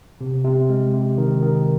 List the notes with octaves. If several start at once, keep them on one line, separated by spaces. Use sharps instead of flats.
C3
C3
G#3
C3
D#3
D#3